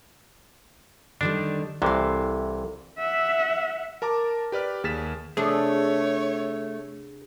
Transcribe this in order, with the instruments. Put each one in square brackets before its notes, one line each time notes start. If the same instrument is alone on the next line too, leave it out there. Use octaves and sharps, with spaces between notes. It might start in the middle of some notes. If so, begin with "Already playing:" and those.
[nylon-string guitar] D3 D#3 G3 [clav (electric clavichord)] D4
[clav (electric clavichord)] C2 C3 E3 [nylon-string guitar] A4 F5
[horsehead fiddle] E5 F#5
[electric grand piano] A#4 A5 A#5 D6
G4 B4 D5 F6
D#2 G#4 F6 A6 B6 E7
[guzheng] C3 D4 [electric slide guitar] A3 [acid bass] G#4 [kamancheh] C#5